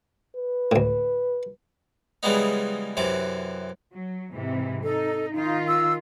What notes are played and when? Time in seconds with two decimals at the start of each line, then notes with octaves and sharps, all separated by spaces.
0.37 B4
0.72 D2 A2
2.23 C#3 E3 G3 G#3 B3 D#4
2.97 F#2 C3 E3 D6
3.93 F#3
4.32 G#2 C3 E3
4.83 D#4 A4
5.34 D#3 D#4 F4
5.68 E6